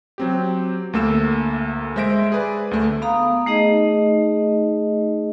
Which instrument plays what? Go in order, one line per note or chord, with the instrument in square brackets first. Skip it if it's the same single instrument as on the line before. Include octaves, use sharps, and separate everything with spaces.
[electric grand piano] F#3 C4 G4
D2 A3 A#3 A4 E6 E7
G#3 C5 E5 A#6 D7
G#4 B4 D5
D2 A3
[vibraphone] B3 F5 A#5 B5 D#6
A3 D#4 G#4 D#5